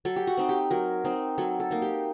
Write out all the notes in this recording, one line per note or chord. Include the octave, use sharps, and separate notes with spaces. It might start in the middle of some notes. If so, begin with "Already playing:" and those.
F#3 A4
G4
F#4
C4 D#4
G4
F#3 A#4
C4 D#4
F#3 A4
A4
A#3 D#4
G4